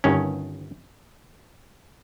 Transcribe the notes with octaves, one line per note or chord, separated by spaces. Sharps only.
G1 G2 D#3 C#4